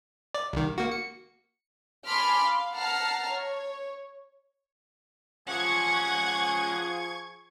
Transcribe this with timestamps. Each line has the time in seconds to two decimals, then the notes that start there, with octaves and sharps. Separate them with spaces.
0.34 D5
0.53 C2 D#3
0.78 A#3 F#4
0.92 C#7
2.07 G#5 A5 B5 C6 D6 F6
2.44 F5
2.75 F#5 A5 A#5 F6 C7
3.29 C#5
5.47 F3 C#4 G4 G#4 F#5 C#6 G#6